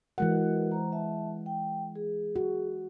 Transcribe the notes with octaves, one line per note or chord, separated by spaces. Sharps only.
E3 G#3 F#4 A#4 F#5
C5 A#5
E5 A5
G5
G#4
F#4